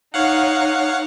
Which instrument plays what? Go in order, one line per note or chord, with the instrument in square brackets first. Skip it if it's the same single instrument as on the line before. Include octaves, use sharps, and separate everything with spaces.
[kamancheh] D#4 [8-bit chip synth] C#5 F5 F#5